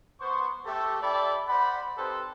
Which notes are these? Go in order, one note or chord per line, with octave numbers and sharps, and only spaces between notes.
B3 C5 C#6
A3 G4 A4
E4 G4 A4 D5 E5 B5
C5 D5 F#5 B5
C4 D#4 G4 A4 B4 C5